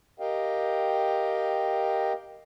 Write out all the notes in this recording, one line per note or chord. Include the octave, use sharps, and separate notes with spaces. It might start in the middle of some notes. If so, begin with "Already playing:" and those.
G4 A#4 D#5 F5 G5